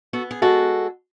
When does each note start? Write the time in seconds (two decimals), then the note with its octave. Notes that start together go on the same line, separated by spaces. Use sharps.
0.13 B3 F#4 A4
0.31 G#4
0.42 G#3 F#4 A4